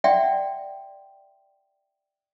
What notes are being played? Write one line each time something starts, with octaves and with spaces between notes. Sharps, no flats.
D5 E5 F#5 G5 C6